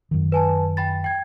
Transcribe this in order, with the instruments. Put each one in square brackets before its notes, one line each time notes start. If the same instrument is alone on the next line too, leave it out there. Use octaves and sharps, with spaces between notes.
[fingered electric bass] F#2 D#3
[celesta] B4 G#5 A5
G5 B5 A6
G5 G#6